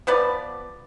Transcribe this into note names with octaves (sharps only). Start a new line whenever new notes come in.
F3 B3 B4 D5